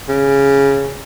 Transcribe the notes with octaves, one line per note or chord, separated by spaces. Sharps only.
C#3